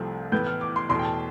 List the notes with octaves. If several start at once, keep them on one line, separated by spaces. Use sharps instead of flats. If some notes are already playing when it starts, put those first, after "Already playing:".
Already playing: C2 C3 F3 A3
A2 E3 B3 G6
F6
D6
C6
E2 B2 A3 C6
G5
A5